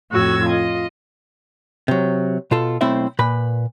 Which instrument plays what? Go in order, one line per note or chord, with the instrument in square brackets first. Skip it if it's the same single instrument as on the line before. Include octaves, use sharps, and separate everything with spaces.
[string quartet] F2 A2 F#4 E6 G#6
F4 D#5
[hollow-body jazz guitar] C3 F#3
B2 F4 A4
B1 A3 C4 E4 C5 E5
A#2 B4 B5